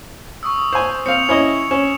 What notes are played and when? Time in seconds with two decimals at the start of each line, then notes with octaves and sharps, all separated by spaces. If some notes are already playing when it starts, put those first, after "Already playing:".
0.43 C#6 D#6 E6
0.72 C5 G#5
1.06 C4 F5 C#7 F7
1.29 C#4 E4 D#5
1.71 C#4 E7